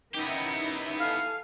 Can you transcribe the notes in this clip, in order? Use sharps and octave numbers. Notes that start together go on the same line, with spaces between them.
B3 C#4 D#4 E4 G4 A#4
A4 F5 G#5